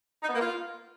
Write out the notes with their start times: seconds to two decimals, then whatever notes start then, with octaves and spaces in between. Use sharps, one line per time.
0.23 D#4
0.29 B3
0.35 A#3
0.41 F4